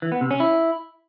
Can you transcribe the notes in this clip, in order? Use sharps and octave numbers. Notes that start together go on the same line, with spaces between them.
E3
B3
C3
C#4
E4